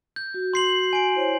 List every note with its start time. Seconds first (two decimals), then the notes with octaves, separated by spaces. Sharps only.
0.16 G6
0.34 F#4
0.54 C6 C7 F#7
0.93 G#5 D7
1.15 E4 C5 C#5